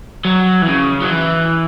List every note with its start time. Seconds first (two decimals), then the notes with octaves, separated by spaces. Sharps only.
0.25 F#3
0.62 E3
0.68 C#3
1.02 F#3
1.10 E3